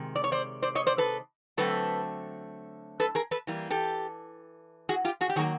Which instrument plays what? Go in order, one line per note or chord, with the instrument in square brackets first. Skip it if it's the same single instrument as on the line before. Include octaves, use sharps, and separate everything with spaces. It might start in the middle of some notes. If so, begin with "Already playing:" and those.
Already playing: [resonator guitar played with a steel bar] C3 D#3 G#3
D5
C#5
C5 D5
C5 D5
C#5 D#5
C5 D5
A4 B4
D3 F#3 A3 C4 A4 B4
A4 B4
G#4 A#4
A4 B4
E3 G3 A#3
G4 A4
F#4 G#4
F4 G4
F#4 G#4
G4
D#3 F#3 A#3 F#4 G#4